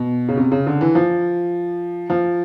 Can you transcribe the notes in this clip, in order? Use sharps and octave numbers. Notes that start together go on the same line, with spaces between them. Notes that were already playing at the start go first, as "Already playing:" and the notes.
Already playing: B2
C#3
C3
C#3
D3
E3
F3
F3